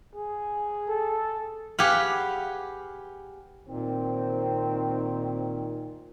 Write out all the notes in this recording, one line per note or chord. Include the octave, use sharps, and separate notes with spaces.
G#4
A4
G4 G#4 B4 F5 F#5
A#2 D#3 C4